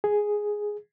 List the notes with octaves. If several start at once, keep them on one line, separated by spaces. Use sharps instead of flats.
G#4